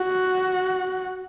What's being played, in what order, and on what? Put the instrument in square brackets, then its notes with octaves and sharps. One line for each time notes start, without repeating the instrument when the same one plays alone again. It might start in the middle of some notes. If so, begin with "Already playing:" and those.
Already playing: [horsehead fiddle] F#4